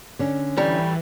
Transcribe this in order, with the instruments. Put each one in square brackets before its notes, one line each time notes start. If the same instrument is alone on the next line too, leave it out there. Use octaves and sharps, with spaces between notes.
[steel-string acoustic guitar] D3 C#4
[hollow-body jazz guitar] A2 G3 A#5 [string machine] E3